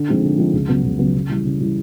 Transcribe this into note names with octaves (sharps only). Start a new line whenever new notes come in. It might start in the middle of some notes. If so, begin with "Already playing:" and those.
Already playing: D3
F3 G#3 C4 D#4
D3
F3 G#3 C4 D#4
C#2
C#3 F#3 B3
C#2
C#3 F#3 B3
C#3
E3 G3
C#3
E3 G3